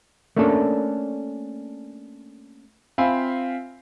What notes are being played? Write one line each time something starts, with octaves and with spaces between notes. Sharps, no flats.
A3 A#3 C#4 D4 A4
C4 F4 E5 F5 G#5 B5